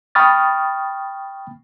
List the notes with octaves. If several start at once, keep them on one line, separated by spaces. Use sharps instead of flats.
G5 B5 C#6 D#6 F6 A6